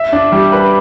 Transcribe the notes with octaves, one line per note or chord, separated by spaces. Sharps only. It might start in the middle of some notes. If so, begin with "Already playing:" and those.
Already playing: E5
D4
G3
B4